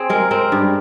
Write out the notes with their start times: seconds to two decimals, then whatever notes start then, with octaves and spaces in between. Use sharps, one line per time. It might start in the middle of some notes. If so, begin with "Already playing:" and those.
Already playing: C4 G#4
0.10 G#3 A#4
0.31 C4 A#4
0.52 G2